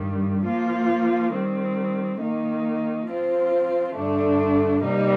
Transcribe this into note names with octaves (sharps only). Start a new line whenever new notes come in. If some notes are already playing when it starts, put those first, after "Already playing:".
Already playing: G2 D#3 G3
F3 A#3 F4
D#3 G3 C4
D#3 A#3 D#4
F3 C4 F4 C5
G2 D3 A3 D4
C3 G3 A#3 D#4